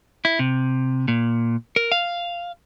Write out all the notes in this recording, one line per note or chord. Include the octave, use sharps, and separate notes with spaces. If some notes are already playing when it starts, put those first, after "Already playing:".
E4
C3
A#2
A#4
F5